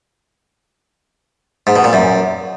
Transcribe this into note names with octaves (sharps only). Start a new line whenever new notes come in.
G#2
B2
A#2
F#2